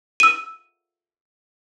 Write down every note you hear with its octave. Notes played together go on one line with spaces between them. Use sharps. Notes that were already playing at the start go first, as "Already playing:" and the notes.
E6 D#7